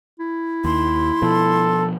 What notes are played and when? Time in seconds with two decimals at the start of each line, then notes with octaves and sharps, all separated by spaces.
0.19 E4
0.64 D#2 C6
1.22 B2 F3 A4